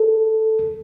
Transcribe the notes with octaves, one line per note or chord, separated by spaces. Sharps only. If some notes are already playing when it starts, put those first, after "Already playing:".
Already playing: A4